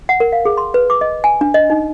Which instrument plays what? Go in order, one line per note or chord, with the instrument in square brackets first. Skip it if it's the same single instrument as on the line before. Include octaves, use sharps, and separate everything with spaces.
[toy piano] F#5
A#4
F5
G#4
C6
B4
D6
D#5
G#5
D4
D#5
D#4